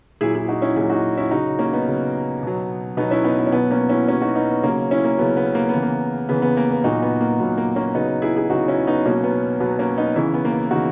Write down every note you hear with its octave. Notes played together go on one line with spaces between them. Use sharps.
A#2 F#3 E4 G#4
E4 G#4
D#4 F#4
C#4 E4
A#2 F#3 E4 G#4
D#4 F#4
C#4 E4
C#3 F#3 D#4 F#4
A#3 C#4
B3 D#4
C#3 F#3
B2 F#3
B2 F#3 B3 D#4
C#4 E4
B3 D#4
B3
C#4
B2 F#3 B3
A#3 C#4
C#4 E4
B2 F#3 A#3 C#4
D#4 F#4
B3 D#4
B3
C#3 F#3 A#3 C#4
C#4 E4
A#3
C#3 F#3 B3
B3
A#3
B3
C#3 E3
A#3
C#3 E3 B3
B3
A#3
B3
A#2 F#3 D#4 F#4
B3
A#3
A#2 F#3 B3
A#3
A#3 C#4
C#3 F#3 B3 D#4
E4 G#4
E4 G#4
C#3 F#3 D#4 F#4
C#4 E4
B3 D#4
B2 F#3 A#3 C#4
B3
B2 F#3 B3
A#3 C#4
B3 D#4
C#3 E3 C#4 E4
B3
A#3
B3
C#3 E3 D#4 F#4